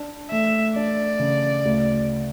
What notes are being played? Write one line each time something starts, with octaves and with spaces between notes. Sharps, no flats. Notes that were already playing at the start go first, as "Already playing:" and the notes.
Already playing: D4
A3 E5
D4 D5
C#3
D2